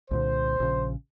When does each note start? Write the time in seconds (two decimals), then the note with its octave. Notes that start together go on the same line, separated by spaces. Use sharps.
0.11 C2 A#2 D3 C5
0.60 A#1 C#3